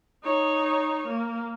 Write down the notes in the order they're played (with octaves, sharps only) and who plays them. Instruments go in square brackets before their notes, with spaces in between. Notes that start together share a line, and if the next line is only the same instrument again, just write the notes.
[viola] D#4 C#5
A#3